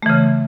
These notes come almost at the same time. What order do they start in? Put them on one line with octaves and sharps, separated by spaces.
A3 E3 C#3